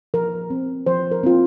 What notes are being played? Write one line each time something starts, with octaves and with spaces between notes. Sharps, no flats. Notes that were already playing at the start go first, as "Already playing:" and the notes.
F3 A#4
C4
F3 C5
A#4
C4 F4